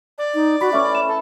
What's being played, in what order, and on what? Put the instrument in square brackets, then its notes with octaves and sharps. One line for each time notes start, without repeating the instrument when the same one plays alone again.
[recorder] D5
[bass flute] D#4
[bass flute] F#4 [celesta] B5 B6
[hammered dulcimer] A2 E3 [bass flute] C#4 [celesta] E5 C#6 D6
[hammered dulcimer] B4 [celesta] E7
[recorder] A4